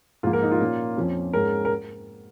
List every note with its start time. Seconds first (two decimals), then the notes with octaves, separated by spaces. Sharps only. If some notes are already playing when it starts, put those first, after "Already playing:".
0.23 G#2 F3 A#3 F4
0.33 A#4
0.43 D#4
0.52 F4
0.60 A#2 A#3 C#4
0.97 F2 F3 C#4
1.33 G#2 G#3 C#4 A#4
1.65 A#4